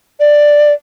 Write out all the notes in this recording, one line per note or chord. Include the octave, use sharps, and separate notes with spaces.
D5